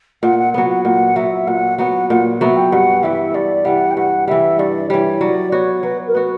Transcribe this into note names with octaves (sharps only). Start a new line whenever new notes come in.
A#2 F#5
F#5
F#3 B3 F#5
F#5
A#2 F#5
F#3 B3 E5
A#2 F#5
F#3 B3 F#5
A#2 F#5
F#3 B3 E5
G5
G2 F#5
E3 G3 E5
G2 D5
E3 G3 F#5
G5
G2 F#5
E3 G3 E5
G2 D5
E3 G3 C#5
F#3 D5
B3 F#4 C#5
F#3 B4
A#4
B3 F#4 B4